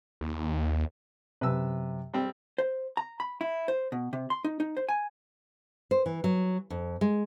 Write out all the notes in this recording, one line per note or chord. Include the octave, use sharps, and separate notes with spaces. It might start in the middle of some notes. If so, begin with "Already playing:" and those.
D#2
F#2 C3 B4 E6
G3 C4
C5
A#5
B5
E4
C5
B2
C3
C6
D#4
D#4
C5
G#5
C5
E3
F#3
F2
G#3